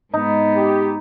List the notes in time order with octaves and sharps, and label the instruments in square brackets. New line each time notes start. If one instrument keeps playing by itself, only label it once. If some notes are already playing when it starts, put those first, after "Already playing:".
[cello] G#2 B3 [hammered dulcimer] D#4
[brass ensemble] G4